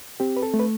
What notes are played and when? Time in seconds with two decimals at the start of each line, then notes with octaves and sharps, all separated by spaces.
0.20 C4 G4
0.37 B4
0.43 A4
0.54 A3
0.59 B4